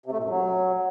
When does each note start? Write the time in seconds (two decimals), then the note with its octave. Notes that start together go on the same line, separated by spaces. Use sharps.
0.06 C3
0.12 A3
0.18 A#2
0.24 F#2
0.30 F#3